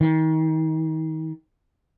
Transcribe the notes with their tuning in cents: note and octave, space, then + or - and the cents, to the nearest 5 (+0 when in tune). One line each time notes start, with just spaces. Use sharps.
D#3 +35